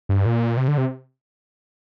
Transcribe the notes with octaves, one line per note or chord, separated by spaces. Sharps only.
G2
A#2
C3
D3
C3